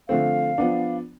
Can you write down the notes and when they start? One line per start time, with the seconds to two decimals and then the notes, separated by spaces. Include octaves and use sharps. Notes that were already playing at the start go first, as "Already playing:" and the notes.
0.09 D3 F3 A3 C4 F5
0.58 F3 B3 D4